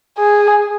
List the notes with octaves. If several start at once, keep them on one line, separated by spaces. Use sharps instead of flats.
G#4